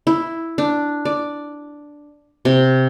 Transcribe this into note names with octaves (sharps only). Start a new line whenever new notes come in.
E4
D4
D5
C3